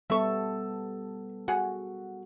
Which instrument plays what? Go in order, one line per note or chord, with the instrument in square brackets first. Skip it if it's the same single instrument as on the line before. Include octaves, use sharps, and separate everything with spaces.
[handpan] G3 B3 A4 [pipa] E5 C#6
[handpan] F#4 [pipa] G#4 F#5